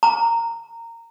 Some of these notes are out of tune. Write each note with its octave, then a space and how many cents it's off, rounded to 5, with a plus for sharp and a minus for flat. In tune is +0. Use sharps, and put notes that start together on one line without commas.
A#5 -20